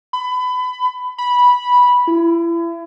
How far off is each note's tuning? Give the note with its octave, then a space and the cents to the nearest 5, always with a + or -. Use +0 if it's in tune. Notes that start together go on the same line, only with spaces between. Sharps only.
B5 +25
B5 -10
E4 +35